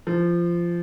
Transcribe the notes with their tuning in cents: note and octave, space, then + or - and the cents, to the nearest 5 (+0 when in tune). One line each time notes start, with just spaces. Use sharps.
F3 -20